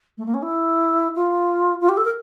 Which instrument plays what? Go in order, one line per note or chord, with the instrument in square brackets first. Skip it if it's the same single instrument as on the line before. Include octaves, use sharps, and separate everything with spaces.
[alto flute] A3
A#3
C#4
E4
F4
F4
G4
A4
A#4